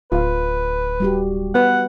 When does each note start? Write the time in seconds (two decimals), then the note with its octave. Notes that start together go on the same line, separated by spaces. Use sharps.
0.12 D1 F4 B4 F5
1.00 G3 F#4 G4
1.55 B3 B4 F#5